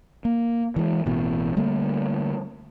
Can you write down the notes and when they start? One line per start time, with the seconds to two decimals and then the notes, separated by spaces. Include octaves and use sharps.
0.25 A#3
0.76 E3 G#3
1.06 A1 B2 E3
1.56 D3 G3 A3 A#3